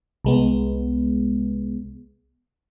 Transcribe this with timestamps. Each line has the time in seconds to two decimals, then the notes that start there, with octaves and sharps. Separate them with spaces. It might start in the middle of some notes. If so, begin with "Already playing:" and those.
0.25 C2 G#3 B3